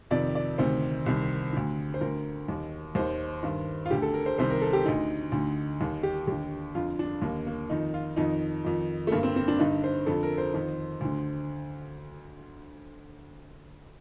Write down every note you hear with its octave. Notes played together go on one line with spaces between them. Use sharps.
F2 C3 D#3 D5
D5
D2 C3 D#3 C5
C2 C3 D#3
D2 D3
C5
D2 D3 A#4
D#2 D#3
D#2 D#3 C5
G2 D#3
F4
D2 D3 G4
A4
A#4
C5
C2 C3 D#3 C5
A#4
A4
G4
D2 D3 D#4
D2 D3
D#2 D#3
G4
D#2 D3 G4
F2 D3 F4
D4
D#2 D3 A#3
A#3
F2 D#3 D#4
F4
F2 D#3 D#4
F2 D#3
A3
G2 D3 A#3
C4
C4
D4
G2 D3 D#4
C5
F2 D3 A4
A#4
C5
F2 D#3
D2 D3